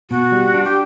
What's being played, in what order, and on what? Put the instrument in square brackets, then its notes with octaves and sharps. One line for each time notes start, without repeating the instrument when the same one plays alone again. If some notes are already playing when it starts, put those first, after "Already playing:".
[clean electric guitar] B2 [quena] F#4
[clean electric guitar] G3
D4
[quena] G4